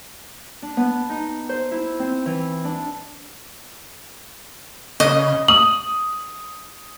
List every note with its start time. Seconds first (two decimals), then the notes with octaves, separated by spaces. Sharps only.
0.62 D4
0.77 B3
1.09 D#4
1.49 C5
1.71 E4
1.99 C4
2.26 E3
2.64 D4
5.00 C#3 D#5
5.48 D#6 F#7